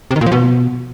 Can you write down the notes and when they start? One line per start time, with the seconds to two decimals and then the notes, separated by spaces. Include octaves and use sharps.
0.11 C3
0.16 D#3
0.21 A#2
0.26 F3
0.32 B2